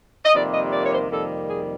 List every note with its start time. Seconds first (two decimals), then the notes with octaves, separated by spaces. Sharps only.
0.25 D#5
0.34 F2 C3 D#3 G3 A#3 D5
0.52 D#5
0.71 D5
0.82 C#5
0.91 C5
1.10 F2 C3 D#3 G3 A#3 A4
1.48 G#4